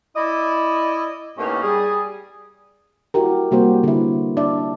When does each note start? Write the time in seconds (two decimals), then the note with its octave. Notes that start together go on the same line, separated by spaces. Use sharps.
0.16 E4 D5 D#5
1.38 A2 A#3 B3 C#4 D#4 G4
1.63 G3 G#4
3.14 E4 F#4 G4 A#4
3.51 C3 G3 A#3 F#4 G4 C5
3.83 D3 E4
4.37 D4 D5 E5